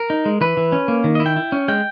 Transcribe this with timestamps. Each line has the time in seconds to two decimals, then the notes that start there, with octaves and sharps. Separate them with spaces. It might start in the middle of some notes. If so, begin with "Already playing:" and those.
Already playing: A#4
0.10 D#4
0.25 G#3
0.41 E3 B4
0.57 E3
0.72 C#4
0.88 A#3
1.04 D#3
1.15 D#5
1.20 E4
1.26 G5
1.36 E4
1.52 C#4
1.68 G#3 G5